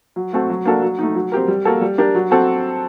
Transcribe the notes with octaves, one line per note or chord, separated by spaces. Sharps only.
F#3
A3 C4 F#4 A4
F#3
A#3 D4 F#4 A4
F#3
A3 D#4
F#3
C4 G4 A#4
G3
A#3 F#4 A4
G3
D4 G4 A#4
F#3
C4 F#4 A4